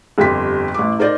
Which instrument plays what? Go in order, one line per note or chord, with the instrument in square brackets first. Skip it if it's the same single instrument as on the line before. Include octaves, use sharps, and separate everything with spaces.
[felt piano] G1 F2 G4 C6 B6
A1 E4 D6
D#4 A#4 C5 D5 D#5